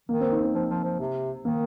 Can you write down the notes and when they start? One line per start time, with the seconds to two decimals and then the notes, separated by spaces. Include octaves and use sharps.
0.09 D#3 A#3
0.20 C4
0.32 D#4
0.43 C4
0.54 F3 C4
0.70 F3
0.84 F3
1.00 C3
1.45 D#3 A#3